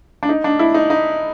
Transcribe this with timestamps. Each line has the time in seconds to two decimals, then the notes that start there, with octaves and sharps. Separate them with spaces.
0.23 D4
0.29 D#4
0.44 D4
0.59 E4
0.74 D#4
0.90 D#4